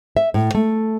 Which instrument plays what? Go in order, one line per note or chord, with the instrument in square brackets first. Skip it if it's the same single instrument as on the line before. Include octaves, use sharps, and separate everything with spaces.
[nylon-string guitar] E5
A2
A3